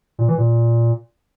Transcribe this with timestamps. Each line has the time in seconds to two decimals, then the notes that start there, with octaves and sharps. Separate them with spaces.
0.19 A#2
0.28 E3
0.38 A#2